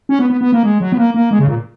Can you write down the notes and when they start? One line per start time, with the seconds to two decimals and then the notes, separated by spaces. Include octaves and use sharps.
0.09 C#4
0.19 B3
0.30 B3
0.41 B3
0.52 A#3
0.63 G#3
0.80 F#3
0.92 B3
0.98 A#3
1.14 A#3
1.31 G#3
1.39 C#3
1.47 A#2